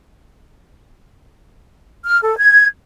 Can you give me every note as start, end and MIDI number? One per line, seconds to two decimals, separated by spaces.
2.05 2.19 89
2.22 2.35 69
2.38 2.66 92